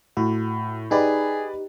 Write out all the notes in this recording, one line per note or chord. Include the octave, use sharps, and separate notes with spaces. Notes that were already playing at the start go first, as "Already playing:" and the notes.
A2 F#4
D#4 G4 G#4 B4 D5 B5